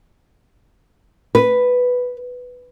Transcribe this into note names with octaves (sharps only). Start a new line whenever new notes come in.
B4